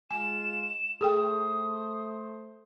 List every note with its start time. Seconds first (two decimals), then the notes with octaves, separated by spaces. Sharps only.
0.11 G#3 F4 G#5 E7
1.01 A3 G#4 A4 C5 G5 D#6